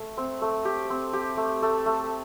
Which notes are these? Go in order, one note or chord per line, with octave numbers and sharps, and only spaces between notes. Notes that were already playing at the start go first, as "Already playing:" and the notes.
Already playing: A3
C4
A3
G4
C4
G4
A3
A3
A3